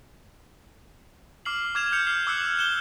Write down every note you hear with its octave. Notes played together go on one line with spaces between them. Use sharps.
D6 F6 C7 F#7
D6 F6 G#6 E7 F7
F6 G6 C#7 F7
F6 C7
D6 E6 F#6 C#7 F#7
G6 C#7 E7 G7